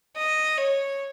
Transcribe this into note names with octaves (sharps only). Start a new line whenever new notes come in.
D#5
C#5